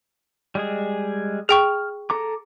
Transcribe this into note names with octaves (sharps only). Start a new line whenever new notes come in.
G3 G#3 G#4
G#4 G5 C#6 F6
A4 A#5 D6